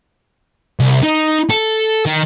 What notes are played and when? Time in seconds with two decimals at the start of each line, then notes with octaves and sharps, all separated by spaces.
0.80 C2
1.03 D#4
1.50 A4
2.06 D#3